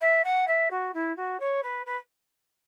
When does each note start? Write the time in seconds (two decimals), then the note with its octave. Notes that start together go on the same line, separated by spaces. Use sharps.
0.01 E5
0.24 F#5
0.47 E5
0.71 F#4
0.94 E4
1.17 F#4
1.40 C#5
1.63 B4
1.86 B4